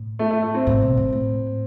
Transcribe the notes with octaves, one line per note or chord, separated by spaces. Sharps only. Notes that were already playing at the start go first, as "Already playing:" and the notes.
Already playing: A2
A3
A3
A3
C4
A2
B2
A2
A2